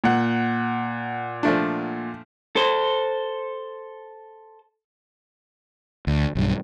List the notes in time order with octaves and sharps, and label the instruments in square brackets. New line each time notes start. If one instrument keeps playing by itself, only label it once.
[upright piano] A#2 F#5
[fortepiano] F3 A3 D4
[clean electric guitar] A4 C5
[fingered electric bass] D2
B1 G2